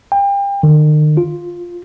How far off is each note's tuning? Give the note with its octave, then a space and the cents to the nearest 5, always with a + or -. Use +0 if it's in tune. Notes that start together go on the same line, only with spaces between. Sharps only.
G5 +35
D#3 -40
F4 +5